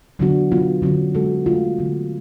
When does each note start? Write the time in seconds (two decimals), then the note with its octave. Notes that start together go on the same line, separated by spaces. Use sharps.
0.19 D3 F#3 B3 D4 F#4
0.51 F#3 B3 F4
0.82 D3 F#3 C#4 F#4
1.14 G#3 B3 F#4 A4
1.46 F3 A3 F4
1.79 D3 F#3 B3